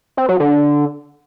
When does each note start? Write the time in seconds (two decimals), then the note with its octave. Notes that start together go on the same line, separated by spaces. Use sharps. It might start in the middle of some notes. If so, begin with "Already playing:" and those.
0.17 C4
0.29 F#3
0.40 D3